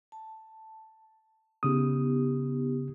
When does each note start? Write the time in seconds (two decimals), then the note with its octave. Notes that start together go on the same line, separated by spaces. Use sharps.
0.12 A5
1.63 C#3 B3 D#4 G4 D#6